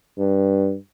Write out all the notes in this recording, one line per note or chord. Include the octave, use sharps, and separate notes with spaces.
G2